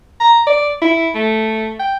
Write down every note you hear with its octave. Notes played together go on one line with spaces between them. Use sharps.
A#5
D5
E4
A3
G5